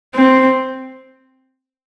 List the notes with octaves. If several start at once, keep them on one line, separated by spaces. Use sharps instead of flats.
C4